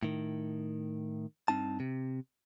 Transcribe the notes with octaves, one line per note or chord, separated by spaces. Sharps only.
A2 D#3
G2 C4 D#4 A5
C3